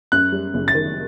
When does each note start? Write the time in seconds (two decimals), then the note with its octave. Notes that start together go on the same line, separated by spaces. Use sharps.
0.12 F#2 F#6
0.32 G3
0.54 F#1
0.68 A6
0.74 D#3